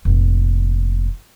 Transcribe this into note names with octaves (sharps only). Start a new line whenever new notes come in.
F1 A#2